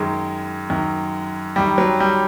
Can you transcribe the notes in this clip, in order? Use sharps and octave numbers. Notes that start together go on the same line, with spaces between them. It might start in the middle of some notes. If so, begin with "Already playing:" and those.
Already playing: F#2 D#3 G#3
F#2 D#3
F#2 D#3 G3
F#3
G3